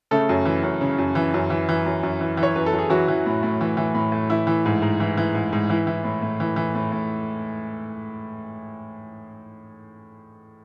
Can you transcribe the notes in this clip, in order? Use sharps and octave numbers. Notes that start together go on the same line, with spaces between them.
C#3 A3 A4
F#2
E3
F#2
C#3
F#2
E3
F#2
E3
E3
F#2
F#2
E3
E3
C#5
F#2 B4
A4
F#2
G#4
E3 F#3 F#4
E3
A2
A2
E3
E3
A2
A2
E3 E4
E3
G#2
G#2
E3
E3
G#2
G#2
E3 E4
E3
A2
A2
E3
E3
A2
A2